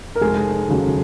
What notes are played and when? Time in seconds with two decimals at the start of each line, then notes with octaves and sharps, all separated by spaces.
0.15 A#4
0.21 F1 G#3 G#4
0.68 D#2 C#3 F#3